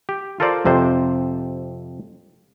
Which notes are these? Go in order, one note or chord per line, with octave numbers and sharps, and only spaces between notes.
G4
F4 A4 A#4 C5 D5
F2 C3 C5